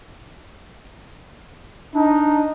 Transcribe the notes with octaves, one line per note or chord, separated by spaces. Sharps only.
D4 D#4